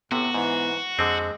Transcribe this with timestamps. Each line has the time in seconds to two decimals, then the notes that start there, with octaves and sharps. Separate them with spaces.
0.12 A2 C3 B3 F#4
0.34 G#2 E3
0.99 F2 D3 G#3 C4